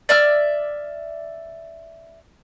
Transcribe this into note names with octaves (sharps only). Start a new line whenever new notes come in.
D5 E5 F6